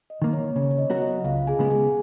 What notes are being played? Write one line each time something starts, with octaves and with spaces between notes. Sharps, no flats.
D#5
D#3 A#3
C#5
C#3 C#5
C#5
D#5
F#3 B3 F#4 A#4
D#5
C#2 F4 F5
G#4 G#5
C#3 G#3 B3
G#4 G#5